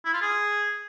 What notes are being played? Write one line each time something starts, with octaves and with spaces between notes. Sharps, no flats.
E4
F4
G#4